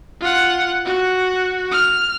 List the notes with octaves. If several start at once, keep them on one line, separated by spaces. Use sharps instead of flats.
F4 F#5
F#4
F6